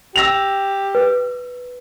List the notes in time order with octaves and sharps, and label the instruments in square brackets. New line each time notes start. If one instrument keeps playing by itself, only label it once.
[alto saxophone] G4 [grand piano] E6 A#6 F7
[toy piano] B4